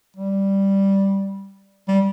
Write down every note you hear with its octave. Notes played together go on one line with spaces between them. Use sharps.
G3
G3